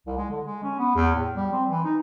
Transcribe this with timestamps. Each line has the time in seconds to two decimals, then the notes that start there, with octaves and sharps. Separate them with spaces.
0.06 C2
0.17 G#3
0.30 D3
0.45 G#3
0.63 C#4
0.79 B3
0.95 E2
1.15 A2
1.36 G3
1.53 C4
1.69 E3
1.84 D#4